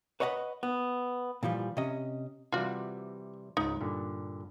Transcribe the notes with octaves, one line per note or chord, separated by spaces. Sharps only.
B4 C#5 D#5 F#5 A5 B5
B3
A#2 E3 F3 G3
C3 C#4 D#5
C3 E3 G3 F4 F#4
C#2 G#2 D#4
G2 A#2 D3